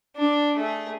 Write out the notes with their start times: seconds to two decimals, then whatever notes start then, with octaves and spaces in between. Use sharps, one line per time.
0.16 D4
0.56 A3 G#4